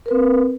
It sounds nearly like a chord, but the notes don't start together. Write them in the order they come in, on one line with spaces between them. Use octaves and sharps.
A#4 B4 C4